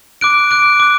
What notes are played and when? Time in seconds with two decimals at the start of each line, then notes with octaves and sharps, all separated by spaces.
0.21 D6 F#6 D7
0.51 D6 F#6 D7
0.80 D6 F#6